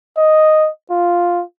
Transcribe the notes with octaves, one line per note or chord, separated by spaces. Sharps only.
D#5
F4